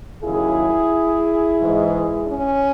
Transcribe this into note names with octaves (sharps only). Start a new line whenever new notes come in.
D#2 C#3 F#3 E4 G#4
G#2 E3 G#3
C#4